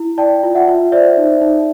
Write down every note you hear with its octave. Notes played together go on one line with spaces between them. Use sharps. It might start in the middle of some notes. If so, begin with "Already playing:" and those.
Already playing: E4
D5 G5 A5
F4
E5 F#5
F4
C5 D5 E5
D#4
D#4